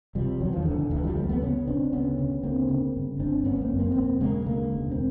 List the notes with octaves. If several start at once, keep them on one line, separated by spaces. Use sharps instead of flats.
C3 F3 G3
E2 E3 F#3
D#3 F3
E1 D3 E3
D3
D2 D3 E3
F3 G3
D2 G3 A3
C4
A3 B3
C#3 B3 C#4
C#3 C4 D4
D2 B3 C#4
C#3
D2 A#3 C4
C#3
G1
G1 C4 D4
G1 B3 C#4
B3
A#3 C4
F#2
A#3 C4
E1 A#3 C4
C#3 G#3 A#3
D2 G#3 A#3
E1
C4